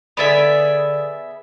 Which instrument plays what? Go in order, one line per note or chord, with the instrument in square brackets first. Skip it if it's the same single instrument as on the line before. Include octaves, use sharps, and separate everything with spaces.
[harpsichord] D3 D4 D5 [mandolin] B3 G#4 E5